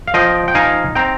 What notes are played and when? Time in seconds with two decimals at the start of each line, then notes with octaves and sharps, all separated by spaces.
0.08 F5
0.14 F3 D#5 G5
0.48 G5
0.55 D#4 F5 G#5
0.95 C4 G5 A#5